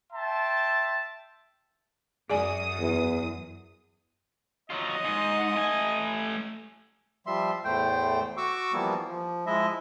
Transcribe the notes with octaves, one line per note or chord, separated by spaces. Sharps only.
E5 G5 A5 C6
F#2 G#4 D5 G#5 D#6
E2
F#3 F4 D#5
G#2
A3 G#5
F3 G3 E5 C6
E2 A2 A3 C5 G5
F#4 C#6 D6 E6
E3 F3 G3 A#3 B3
F3
F3 G#3 E4 D#5 E5